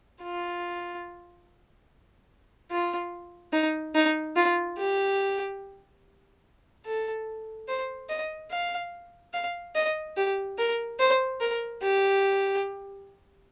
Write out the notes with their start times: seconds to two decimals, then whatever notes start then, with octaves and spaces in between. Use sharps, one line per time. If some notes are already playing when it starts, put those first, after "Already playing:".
0.22 F4
2.71 F4
3.52 D#4
3.95 D#4
4.36 F4
4.78 G4
6.85 A4
7.68 C5
8.09 D#5
8.51 F5
9.33 F5
9.75 D#5
10.16 G4
10.58 A#4
10.99 C5
11.41 A#4
11.82 G4